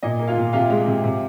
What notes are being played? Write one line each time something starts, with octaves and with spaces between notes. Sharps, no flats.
A#2 D#5
A#3
F4 F5
A#2
C3 F4 F5
G#3
C3
C3